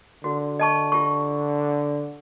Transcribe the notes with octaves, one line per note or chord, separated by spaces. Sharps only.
D3 F#4
D#5 A5 C#6
F4 G4 C#6